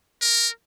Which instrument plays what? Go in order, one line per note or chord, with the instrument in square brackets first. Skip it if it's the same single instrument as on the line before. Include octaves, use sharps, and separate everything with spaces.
[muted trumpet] A#4